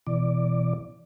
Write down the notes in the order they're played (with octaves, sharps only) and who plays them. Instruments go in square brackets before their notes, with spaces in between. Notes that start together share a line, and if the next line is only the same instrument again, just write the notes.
[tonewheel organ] B2 E3 D5